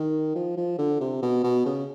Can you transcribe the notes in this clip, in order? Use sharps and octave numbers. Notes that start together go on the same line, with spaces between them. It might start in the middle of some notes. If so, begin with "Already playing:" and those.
Already playing: D#3
F3
F3
D3
C3
B2
B2
C#3